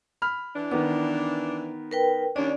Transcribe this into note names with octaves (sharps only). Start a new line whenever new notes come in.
B5 F6
E3 D4
D#3 B3 D6
A#4 B4 G5
D#2 C#4 D4 D5